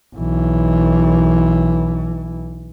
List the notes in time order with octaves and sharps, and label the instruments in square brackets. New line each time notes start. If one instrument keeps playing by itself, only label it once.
[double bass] B1 E3